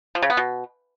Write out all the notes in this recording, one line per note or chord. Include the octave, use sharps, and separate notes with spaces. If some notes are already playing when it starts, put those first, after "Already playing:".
F3
C#3
B3
B2